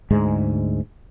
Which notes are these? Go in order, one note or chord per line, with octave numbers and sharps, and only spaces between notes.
D2 G#2 G#3